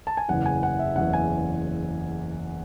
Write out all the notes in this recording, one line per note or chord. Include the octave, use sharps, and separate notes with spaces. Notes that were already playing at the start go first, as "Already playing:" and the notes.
A5
G#5
F#1 E2 C#3 E3 F#5
G#5
F#5
E5
F#1 E2 C#3 E3 F#5
G#5